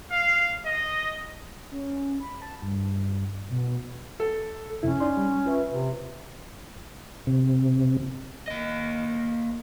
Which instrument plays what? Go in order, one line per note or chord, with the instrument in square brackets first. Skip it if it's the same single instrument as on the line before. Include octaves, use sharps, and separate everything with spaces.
[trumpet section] F5
D#5
[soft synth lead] C#4
B5
A5
G2
B2
[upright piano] A4
[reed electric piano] F2 C3 E4 [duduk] C#4
[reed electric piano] D#4 D5 C6
G3
F4 B4 E5
[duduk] C3
[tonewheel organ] C3
[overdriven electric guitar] A#3 D#5